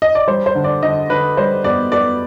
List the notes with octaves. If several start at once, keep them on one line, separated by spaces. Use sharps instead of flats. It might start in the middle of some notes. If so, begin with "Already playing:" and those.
D#5
D5
G3 C5
C5
D3
D5
D3 D#5
D3 B4
G3 C5
B3 D5
B3 D5